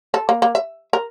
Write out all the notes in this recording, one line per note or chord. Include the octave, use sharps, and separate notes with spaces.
A4
A#3
A#3
E5
A#4